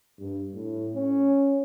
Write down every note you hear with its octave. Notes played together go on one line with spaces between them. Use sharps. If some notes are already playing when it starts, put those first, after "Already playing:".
G2
A2
C#4